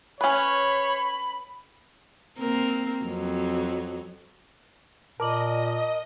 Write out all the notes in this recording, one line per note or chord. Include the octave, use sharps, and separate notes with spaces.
C#4 B4 C#5 B5
A#3 C4 A#4
F2 F#3
A#2 A#4 D#5 A5 D6 F#7